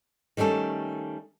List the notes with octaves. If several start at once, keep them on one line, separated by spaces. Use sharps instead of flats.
D#3 G3 A3 C#4 A4